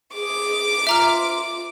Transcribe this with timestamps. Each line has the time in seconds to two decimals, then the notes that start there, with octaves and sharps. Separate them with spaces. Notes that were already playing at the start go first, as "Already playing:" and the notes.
0.14 G#4 D6
0.87 F4 E5 A#5 F6